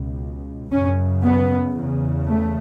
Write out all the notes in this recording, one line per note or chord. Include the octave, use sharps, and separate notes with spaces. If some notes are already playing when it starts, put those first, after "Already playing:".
Already playing: C#2 B2
F#2 C#3 C#4
B3
E2 C#3
A3